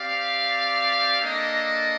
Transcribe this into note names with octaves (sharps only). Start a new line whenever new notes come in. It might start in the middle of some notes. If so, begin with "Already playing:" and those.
Already playing: C4 G4 D5 F5
A#3 D4 A4 D#5